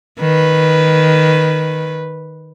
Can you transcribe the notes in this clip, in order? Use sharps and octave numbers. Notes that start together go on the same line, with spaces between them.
D#3 B4